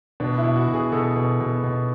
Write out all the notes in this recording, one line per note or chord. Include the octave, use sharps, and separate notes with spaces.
B2 D4
E4
B2
F#4
B2
G#4
B2 A4
B2
B2
B2